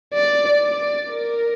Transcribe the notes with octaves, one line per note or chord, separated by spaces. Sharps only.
D5
D5
A#4